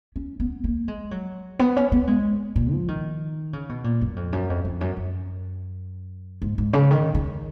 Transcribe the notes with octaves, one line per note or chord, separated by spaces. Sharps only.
C#4
B3
A#3
G#3
F#3
B3
C#4
B3
G#3
A#2
F3
D#3
C#3
B2
A#2
F#2
F2
F#2
F2
F2
F#2
F#2
G#2
G#2
C#3
D#3
D#3